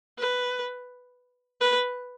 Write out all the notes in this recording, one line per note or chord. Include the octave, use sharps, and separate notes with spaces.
B4
B4